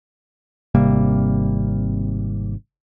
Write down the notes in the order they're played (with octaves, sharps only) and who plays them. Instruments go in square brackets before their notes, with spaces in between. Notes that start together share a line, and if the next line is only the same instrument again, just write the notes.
[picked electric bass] G#1 C3 G3 A#3